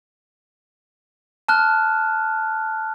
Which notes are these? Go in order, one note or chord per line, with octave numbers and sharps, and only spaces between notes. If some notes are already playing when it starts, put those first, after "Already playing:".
A5 F6 F#6